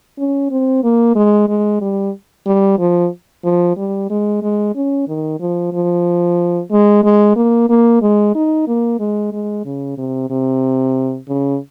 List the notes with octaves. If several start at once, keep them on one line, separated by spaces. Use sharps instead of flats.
C#4
C4
A#3
G#3
G#3
G3
G3
F3
F3
G3
G#3
G#3
C#4
D#3
F3
F3
G#3
G#3
A#3
A#3
G#3
D#4
A#3
G#3
G#3
C#3
C3
C3
C#3